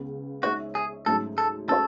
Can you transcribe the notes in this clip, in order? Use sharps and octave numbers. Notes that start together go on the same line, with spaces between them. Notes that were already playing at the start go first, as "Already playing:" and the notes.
Already playing: C#2 C#3 B3
G#3 D#4 F#4 G#4 C#5 E5
G#4
G#2 F#3 A3 C#4 A4
A4
G#3 C#4 F#4 A4 C#5